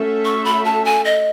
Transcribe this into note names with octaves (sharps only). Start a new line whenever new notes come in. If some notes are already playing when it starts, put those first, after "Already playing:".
Already playing: A3 C#4 F#4 A4 E5
C#6
B5
A5
G#5
D#5